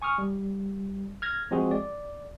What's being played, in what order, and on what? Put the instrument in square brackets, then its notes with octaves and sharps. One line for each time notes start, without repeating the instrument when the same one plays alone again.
[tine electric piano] G#5 C#6 D#6 F6
G3
F6 G#6 A#6
F3 G#3 C4 F#4 G#4
D5